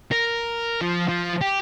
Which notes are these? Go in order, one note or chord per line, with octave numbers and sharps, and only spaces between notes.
A#4
F3
F3
G4